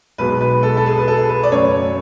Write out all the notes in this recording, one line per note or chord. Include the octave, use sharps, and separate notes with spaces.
B1 B2 G#3 B4
B4
A4
A4
G#4
B4
A4
B4
D5
F#2 C#3 F#3 A3 C#5